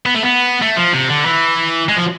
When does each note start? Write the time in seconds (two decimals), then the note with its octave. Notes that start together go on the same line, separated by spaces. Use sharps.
0.06 B3
0.15 A3
0.23 B3
0.62 A3
0.77 F3
0.94 C3
1.09 D3
1.26 E3
1.89 G#3
1.97 F3